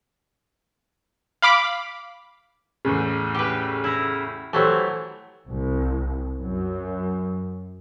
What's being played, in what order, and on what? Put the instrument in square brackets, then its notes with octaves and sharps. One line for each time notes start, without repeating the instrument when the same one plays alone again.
[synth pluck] F5 B5 D6
[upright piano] E2 A2 C#3
[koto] G4 B4
E4 A#5
[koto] E3 F#3 A3 [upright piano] G4 C5
[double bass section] C2
F#2